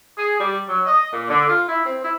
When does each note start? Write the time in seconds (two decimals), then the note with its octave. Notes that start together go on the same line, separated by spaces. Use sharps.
0.18 G#4
0.39 G3
0.69 F#3
0.87 D#5
1.13 A#2
1.29 D3
1.48 F4
1.68 E4
1.85 C4
2.04 E4